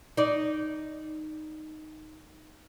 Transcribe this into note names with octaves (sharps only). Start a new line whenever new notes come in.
D#4 D5